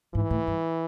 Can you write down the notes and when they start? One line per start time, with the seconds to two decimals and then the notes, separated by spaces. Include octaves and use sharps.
0.14 G#2 E3
0.30 A2
0.47 G2